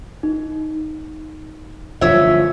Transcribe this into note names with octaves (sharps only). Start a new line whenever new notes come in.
D#4
D1 G2 E3 F3 C#4 E5